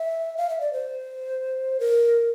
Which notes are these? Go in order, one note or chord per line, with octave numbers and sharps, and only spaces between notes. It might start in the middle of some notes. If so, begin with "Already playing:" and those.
Already playing: E5
F5
E5
D5
C5
A#4